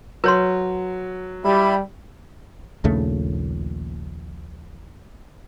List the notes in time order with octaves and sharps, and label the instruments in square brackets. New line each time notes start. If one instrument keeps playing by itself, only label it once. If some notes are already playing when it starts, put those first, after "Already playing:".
[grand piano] F#3 [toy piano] B4 C#5 C6
[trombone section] G3 [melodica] E4 E5 B5
[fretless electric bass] A#1 D#2 C#3 A3